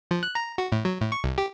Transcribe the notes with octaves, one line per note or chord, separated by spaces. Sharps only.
F3
F#6
A#5
F#4
A2
F#3
A2
C#6
C2
G4